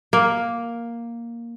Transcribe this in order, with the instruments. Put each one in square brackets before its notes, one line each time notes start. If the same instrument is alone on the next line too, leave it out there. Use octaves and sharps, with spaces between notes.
[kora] A#3